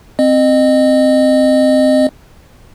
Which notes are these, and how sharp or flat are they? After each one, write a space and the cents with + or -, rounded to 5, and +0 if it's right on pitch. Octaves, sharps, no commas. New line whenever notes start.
C4 +0 D#5 -25